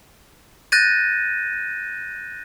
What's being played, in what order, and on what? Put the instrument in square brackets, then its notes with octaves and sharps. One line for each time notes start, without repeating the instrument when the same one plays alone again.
[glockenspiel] F#6 G6 A6 A#6 D#7